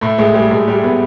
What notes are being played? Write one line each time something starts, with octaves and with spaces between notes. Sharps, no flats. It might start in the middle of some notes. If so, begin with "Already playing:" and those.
A2 A3
A2 G#3
G3 G#3
A2 G#3
G3 A3
A2 B3